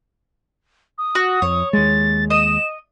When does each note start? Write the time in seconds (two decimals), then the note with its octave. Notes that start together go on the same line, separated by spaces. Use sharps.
0.98 D#6
1.15 F#4
1.42 F2 C#5
1.73 D#2 G#3 A6
2.30 D#5 E7